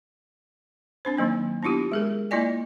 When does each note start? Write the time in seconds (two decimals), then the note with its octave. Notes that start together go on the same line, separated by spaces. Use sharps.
1.05 C4 D4 C5
1.17 D#3 F#3 A#3 D#4
1.63 B3 D4 E4 F4 G4
1.92 G#3 G#4 A#4
2.31 A#3 E4 F4 D5 D#5 G#5